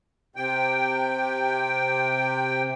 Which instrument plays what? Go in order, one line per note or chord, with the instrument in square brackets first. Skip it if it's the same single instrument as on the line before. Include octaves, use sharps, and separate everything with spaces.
[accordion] C3 G5